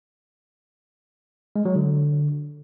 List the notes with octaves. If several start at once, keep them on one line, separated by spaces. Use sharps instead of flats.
G#3
F#3
D3